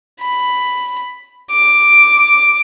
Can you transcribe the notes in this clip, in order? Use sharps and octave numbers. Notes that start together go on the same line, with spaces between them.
B5
D6